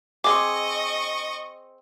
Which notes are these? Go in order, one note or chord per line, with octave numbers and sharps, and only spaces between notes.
C4 G#4 D#5 C#6 D6